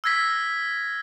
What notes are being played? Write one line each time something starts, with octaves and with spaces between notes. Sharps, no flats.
E6 F6 G#6 A#6 B6